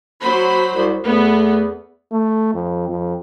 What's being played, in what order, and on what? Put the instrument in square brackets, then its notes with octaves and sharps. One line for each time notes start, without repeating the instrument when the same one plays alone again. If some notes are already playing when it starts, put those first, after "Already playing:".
[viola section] F#3 C5 B5
[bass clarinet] C2
[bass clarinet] E2 [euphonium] A3 [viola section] B3
[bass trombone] A3
F2
F2